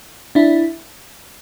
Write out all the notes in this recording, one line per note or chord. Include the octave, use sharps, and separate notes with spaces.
D4 E4